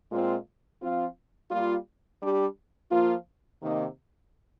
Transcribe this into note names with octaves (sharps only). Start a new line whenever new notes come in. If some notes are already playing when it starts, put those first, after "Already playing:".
A#2 G#3 C4 F4
F3 C4 F4
G3 A#3 F4
G3 D4 G4
F3 A#3 F4
C3 D#3 A#3 D#4